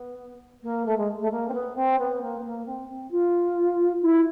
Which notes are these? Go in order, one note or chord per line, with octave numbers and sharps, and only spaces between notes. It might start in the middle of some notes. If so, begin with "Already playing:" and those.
Already playing: B3
A#3
A3
G#3
A3
A#3
C4
B3
C4
B3
A#3
B3
A#3
C4
C4
F4
E4